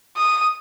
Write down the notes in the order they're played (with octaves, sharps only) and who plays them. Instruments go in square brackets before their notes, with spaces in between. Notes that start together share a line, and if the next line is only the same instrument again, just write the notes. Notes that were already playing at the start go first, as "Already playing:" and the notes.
[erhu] D#6